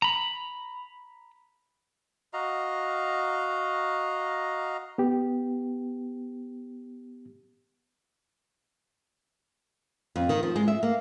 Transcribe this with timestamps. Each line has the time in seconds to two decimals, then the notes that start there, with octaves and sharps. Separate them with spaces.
0.02 A#5 B5
2.33 F#4 D#5 F5 A#5
4.98 B3 G4
10.16 F2
10.29 D#3
10.43 F3
10.56 G#3
10.68 E5
10.83 A#3